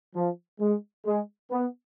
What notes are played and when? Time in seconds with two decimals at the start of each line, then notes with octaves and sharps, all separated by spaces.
0.15 F3
0.60 G#3
1.05 G#3
1.51 B3